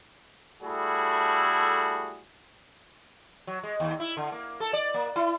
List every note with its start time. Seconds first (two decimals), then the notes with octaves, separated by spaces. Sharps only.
0.63 G3 A3 E4 F#4 G#4 A4
3.47 F#3
3.63 G#3
3.80 D#2
4.00 E4
4.17 D3
4.32 A#3
4.60 A4
4.73 D5
4.94 A#3
5.16 E4